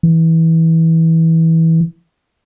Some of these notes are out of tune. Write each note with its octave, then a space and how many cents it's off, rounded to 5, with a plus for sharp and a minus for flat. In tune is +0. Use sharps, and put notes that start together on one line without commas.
E3 -20